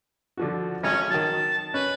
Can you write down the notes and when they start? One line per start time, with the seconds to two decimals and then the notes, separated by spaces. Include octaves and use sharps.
0.37 D3 F3 F#4
0.84 G#1 C#4
1.10 D#3 F#3 A5
1.74 C#4 B4